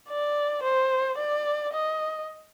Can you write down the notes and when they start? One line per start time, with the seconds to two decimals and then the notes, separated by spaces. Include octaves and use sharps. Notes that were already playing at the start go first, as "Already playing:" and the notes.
0.09 D5
0.63 C5
1.18 D5
1.73 D#5